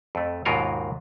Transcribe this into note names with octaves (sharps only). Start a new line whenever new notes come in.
F2 A3
D#2 G#2 B2 F4 A#4 C#5